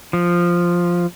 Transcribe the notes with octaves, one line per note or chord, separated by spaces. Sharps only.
F3